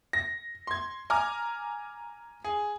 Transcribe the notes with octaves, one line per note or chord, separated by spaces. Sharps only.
A#6
C6 G#6
G#5 A#5 D6 F6
G#4